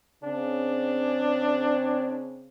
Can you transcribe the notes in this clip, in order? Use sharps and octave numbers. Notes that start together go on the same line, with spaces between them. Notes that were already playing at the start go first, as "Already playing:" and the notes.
C#3 C4 D4